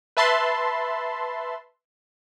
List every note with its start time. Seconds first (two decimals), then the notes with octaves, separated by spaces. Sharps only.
0.17 B4 E5 A5 B5 C6